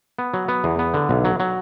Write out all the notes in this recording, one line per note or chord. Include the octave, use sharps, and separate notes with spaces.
B3
F#3
B3
E2
B3
D3
B1
F#3
F#3